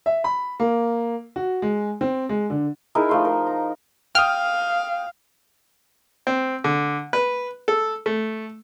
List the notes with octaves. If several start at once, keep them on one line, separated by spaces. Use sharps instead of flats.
E5
B5
A#3
F#4
G#3
C4
G#3
D3
D#4 E4 G#4 A#4
F3 A3 C6
A#4
A#5
F5 G5 D#6 F6
C4
D3
B4
A4
A3